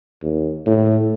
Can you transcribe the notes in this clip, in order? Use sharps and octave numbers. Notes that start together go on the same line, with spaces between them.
D#2
A2